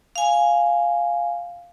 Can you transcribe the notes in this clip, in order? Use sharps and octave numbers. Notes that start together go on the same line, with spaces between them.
F5 G#5